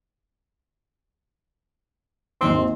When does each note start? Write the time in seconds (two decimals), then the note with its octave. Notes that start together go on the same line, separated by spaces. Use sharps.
2.41 G#1 D#2 C4 C6